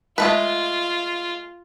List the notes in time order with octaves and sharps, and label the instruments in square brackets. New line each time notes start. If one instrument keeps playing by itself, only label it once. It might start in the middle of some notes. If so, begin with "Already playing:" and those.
[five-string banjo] G#3 A3 B4 [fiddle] F4